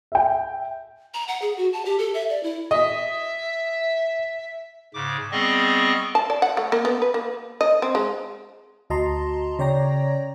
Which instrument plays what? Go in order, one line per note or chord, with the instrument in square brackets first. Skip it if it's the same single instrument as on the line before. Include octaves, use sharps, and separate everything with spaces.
[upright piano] E5 G5
[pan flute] A#5
F#5
G#4
F#4
A5
G4
A4
E5
D5
E4
[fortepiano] D#5 [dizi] E5
[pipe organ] G#2 C#3 D6
G3 B3 C4 G#4 D#5 C#6
[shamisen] A5
D5
F#5
A3
A#3
B3
B4
A#3
D#5
C4
G#3
[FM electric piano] D2 F#4 D#5 A5 A#5 C6
C#3 C#5 D5 G5 A#5 A#6